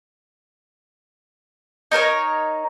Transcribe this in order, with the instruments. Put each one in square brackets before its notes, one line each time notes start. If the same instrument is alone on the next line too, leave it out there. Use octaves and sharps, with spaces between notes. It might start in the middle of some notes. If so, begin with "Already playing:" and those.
[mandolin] D#4 A#4 C5 C#5